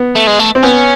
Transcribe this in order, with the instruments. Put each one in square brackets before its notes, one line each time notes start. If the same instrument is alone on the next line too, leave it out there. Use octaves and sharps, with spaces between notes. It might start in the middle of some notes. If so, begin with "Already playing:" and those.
Already playing: [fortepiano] B3
[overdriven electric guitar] A3
G#3
A3
[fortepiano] C4
[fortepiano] B3 [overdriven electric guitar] C#4